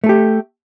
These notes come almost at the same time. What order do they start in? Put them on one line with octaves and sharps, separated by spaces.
A3 A4 G4